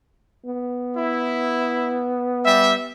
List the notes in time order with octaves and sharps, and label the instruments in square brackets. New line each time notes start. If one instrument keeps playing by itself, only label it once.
[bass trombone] B3
[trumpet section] E4
G3 E5